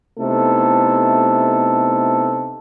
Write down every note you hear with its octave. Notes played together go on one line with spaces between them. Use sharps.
C3 A3 B3 D#4 E4 A4